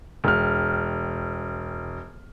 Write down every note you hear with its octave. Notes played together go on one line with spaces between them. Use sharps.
E1 F6